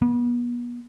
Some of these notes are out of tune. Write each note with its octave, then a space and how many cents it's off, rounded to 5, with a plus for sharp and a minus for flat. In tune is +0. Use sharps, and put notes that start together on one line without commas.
B3 -35